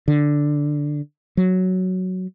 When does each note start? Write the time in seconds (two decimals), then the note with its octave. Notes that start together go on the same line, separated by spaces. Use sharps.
0.08 D3
1.37 F#3